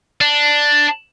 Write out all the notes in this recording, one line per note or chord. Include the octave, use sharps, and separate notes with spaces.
D4